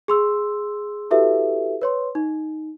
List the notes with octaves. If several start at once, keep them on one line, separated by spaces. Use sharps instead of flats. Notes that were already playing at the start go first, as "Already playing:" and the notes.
G#4 C6 E6
E4 F#4 G4 A4 B4 E5
B4 C#5 C6
D#4